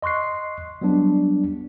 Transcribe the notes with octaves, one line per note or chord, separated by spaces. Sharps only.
D#5 C6 C#6 F#6 C7
F#3 G3 B3 D4